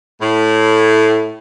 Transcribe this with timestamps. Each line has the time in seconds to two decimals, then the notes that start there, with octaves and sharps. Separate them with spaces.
0.21 A2